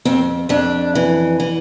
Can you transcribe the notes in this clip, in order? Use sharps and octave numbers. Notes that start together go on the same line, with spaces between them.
F2 C4
F2 D4
E3
E3